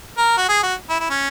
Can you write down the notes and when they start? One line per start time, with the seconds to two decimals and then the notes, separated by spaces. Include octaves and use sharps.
0.18 A#4
0.38 F#4
0.49 G#4
0.63 F#4
0.90 E4
1.00 E4
1.10 C#4